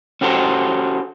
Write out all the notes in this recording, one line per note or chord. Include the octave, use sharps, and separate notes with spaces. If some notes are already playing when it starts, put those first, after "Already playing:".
C#4 F#4 G4 A4 C5